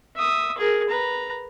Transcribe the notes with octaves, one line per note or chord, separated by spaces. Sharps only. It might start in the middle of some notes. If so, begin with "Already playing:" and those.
E5 D#6
G#4 A#4
B4 A#5